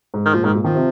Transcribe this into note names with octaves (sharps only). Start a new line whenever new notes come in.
G#2
D#3
A#2 F3
G#2 D#3
A#2
D#3 F3
C3